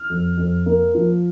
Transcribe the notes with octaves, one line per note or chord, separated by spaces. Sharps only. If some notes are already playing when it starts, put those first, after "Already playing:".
Already playing: F6
F2
F2
A#3
F3